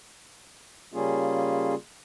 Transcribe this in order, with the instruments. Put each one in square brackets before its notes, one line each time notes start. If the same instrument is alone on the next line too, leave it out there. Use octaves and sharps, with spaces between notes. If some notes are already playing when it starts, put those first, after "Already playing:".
[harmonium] C#3 G3 A#3 C#4 F4 G#4